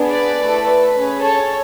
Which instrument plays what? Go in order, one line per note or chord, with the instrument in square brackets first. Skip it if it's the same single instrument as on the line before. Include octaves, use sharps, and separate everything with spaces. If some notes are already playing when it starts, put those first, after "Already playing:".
Already playing: [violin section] B3 D4 G#4
B4 D5
A3 E4 A4
B4
C#4 G#4
A4 C#5